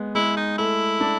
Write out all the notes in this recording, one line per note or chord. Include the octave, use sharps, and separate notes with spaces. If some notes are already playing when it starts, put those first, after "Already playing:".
Already playing: G#3 B3
G#3 E4
D#4
A3 E4
D4